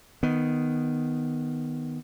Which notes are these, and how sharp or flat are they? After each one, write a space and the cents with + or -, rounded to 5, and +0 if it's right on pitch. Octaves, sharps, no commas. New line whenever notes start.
D#3 -5 B3 +0